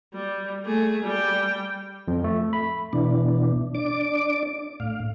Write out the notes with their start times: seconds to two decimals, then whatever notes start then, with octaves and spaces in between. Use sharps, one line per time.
0.13 G3
0.65 A3 G#4
1.04 G3 G5
2.08 F2
2.24 A3
2.53 B5
2.93 B2 E3 D4
3.75 D4 D5 D6
4.80 A2 F5